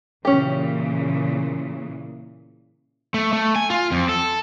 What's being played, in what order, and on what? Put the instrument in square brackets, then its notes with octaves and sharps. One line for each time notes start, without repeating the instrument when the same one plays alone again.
[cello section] A#2 C#3 E3 [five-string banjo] C#4 G4
[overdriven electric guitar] A3
A3
G#5
F4
F2
A4